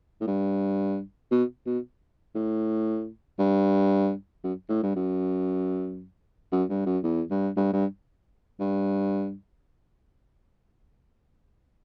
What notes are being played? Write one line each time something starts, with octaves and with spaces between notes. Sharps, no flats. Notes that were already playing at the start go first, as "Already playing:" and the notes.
A2
G2
B2
B2
A2
G2
F#2
A2
G2
F#2
F#2
G2
F#2
E2
G2
G2
G2
G2